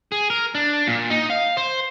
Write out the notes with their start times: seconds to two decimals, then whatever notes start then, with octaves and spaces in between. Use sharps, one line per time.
0.12 G#4
0.30 A#4
0.55 D4
0.87 A#2
1.10 D#4
1.30 F5
1.57 C5